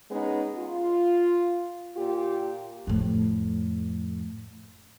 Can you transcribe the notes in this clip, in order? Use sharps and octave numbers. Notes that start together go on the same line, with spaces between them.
G#3 B3 C#4 D#4
F4
A#2 F4 G4
F2 A2